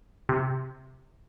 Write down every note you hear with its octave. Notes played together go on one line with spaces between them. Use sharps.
C3